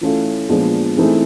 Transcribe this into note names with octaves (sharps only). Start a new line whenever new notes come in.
E3 A3 C#4 F4 A4
A#2 F3 G#3 B3 D4
E3 A3 C4 D#4 G#4